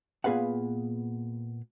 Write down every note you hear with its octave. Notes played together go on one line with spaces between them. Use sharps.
A#2 B3 G#4 B4 F5 F#5